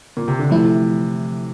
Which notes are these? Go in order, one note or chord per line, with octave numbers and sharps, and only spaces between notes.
A#2
C3
D3
C3 E3 F3 A3 E4